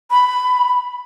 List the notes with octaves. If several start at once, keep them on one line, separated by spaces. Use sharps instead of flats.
B5